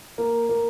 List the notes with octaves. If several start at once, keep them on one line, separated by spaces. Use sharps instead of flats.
A#3
A#3